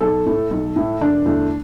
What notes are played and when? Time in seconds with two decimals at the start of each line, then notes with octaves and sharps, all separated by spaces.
0.01 B1 A4
0.26 A2 A3
0.51 B1
0.76 A2 A3
1.01 E1 D4
1.25 E2 D3 A3